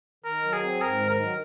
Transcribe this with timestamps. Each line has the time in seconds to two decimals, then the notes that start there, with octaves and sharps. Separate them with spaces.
0.24 D#3 A#4
0.44 F#3
0.53 G#4
0.63 C4
0.81 G#2 A#4
1.00 D#3
1.10 A#4
1.19 F#3